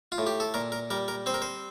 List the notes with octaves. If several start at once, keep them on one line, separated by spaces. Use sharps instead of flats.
F4
A2
G4
A4
A#2 A#4
A#4
G3 A#4
A#4
C4 C5
A#4
C5